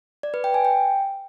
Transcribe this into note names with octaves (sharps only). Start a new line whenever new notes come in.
D5
B4
G5
G#5
G5